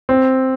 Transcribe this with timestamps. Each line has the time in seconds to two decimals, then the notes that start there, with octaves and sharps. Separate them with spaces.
0.09 C4